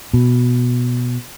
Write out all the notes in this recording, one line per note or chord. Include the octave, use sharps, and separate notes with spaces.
B2